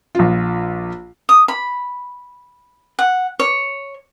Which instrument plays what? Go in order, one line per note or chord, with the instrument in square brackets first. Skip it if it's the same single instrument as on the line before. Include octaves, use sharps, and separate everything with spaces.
[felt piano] A#1 F4
[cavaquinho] D#6
B5
F#5
C#5